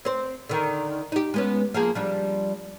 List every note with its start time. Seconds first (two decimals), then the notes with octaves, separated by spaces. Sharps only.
0.05 C4 C5
0.49 D3 D#3
1.12 D#4 G4
1.34 G#3 B3 C#4
1.74 F3 A#3 G#4
1.95 F3 G3 D4